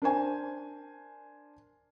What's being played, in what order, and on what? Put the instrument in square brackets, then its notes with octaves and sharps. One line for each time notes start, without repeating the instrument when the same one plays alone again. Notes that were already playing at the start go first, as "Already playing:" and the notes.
[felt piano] D4 A#4 C5 G#5